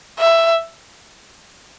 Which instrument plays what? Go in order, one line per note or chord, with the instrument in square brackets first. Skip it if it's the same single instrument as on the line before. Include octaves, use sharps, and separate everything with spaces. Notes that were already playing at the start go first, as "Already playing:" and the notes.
[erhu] E5